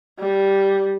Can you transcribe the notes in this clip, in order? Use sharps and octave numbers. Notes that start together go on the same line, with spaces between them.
G3